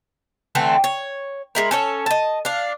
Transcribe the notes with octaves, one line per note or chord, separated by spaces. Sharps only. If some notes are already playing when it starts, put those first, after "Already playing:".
D3 E3 A3 C4
C#5
G#3 E4 A#4
C#4 A4 C#5
D#5 A5
D4 F5